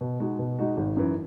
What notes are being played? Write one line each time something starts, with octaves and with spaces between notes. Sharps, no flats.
B2
G#3 D#4 F#4
B2
G#3 D#4 F#4
G#1
F#2 E3